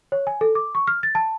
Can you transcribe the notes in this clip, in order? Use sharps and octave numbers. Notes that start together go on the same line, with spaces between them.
C#5
G#5
A4
D6
C#6
F6
A6
A5